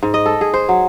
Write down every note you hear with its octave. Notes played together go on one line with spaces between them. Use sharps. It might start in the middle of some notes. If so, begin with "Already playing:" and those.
G#2
D#5
A4
G#4
C5
F#3